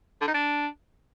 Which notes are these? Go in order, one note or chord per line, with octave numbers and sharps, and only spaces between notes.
D3
D#4
D4